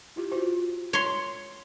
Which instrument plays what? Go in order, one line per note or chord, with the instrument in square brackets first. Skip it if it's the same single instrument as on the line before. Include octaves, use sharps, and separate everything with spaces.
[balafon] E4 F4 G4
F4 F#4 C5
[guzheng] C#5 C6